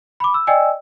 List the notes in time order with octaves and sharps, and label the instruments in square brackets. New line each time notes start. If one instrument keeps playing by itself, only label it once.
[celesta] B5 D6
E6
D5 D#5 G5 G#5 E6